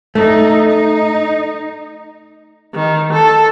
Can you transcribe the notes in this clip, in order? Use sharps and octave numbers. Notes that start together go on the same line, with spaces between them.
A3 D#4
D#4
D#3
A4